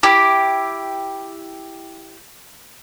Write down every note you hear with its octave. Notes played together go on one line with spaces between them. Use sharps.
E4 G4